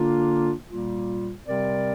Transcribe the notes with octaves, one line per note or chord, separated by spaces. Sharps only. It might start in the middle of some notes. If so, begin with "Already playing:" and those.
Already playing: D3 A#3 D4 F4
A#2 G3 A#3 F4
C3 G3 C4 A#4 D5